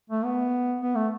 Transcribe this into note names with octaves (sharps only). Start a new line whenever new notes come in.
A3
B3
B3
A3